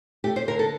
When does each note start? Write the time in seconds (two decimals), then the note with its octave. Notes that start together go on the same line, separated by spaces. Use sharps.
0.24 A3 G4
0.36 C5
0.48 D3 A#4
0.59 A4